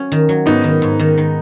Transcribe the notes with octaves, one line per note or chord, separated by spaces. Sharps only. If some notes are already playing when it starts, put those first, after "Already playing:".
Already playing: F#3 C#4
D#3
F#3
G#2 B3 D#4
D#3
G#2
D#3
D#3